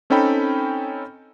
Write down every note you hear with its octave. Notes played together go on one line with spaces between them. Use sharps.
C4 C#4 D#4 A4 G5 B5